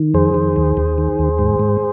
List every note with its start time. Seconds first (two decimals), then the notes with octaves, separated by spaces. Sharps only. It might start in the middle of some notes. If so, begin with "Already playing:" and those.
Already playing: D#3
0.14 F2 G#4 C5
0.34 D#3
0.56 D#2
0.77 D#2
0.98 D#3
1.19 D#2
1.39 G#2
1.59 G#2